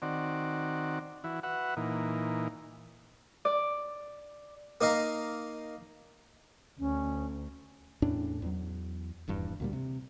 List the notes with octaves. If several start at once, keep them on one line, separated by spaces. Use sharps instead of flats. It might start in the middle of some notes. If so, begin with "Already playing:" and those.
D#3 C4 F#4 D5
E3 E4 F#4
F#4 B4 E5 F#5
A#2 E3 D#4
D5
A#3 D#4 D#5 F5 A#5
D2 C#4
E2 A2 C#4 D4
E2 F#3
D#1 E2 G2
D2 A#2 G3
C3